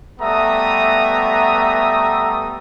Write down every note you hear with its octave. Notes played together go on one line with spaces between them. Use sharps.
G3 A3 B3 E5 A#5 D#6